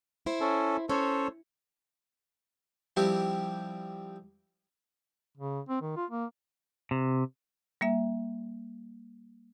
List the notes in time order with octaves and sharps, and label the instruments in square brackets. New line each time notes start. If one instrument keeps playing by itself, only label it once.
[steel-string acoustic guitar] E4 C5
[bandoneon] C#4 A4
[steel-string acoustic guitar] C#4 [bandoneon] A4 C5 C#5
[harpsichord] F3 G3 C4 E4 G4
[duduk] C#3
C4
D#3
F4
A#3
[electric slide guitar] C3
[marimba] G3 A#3 E5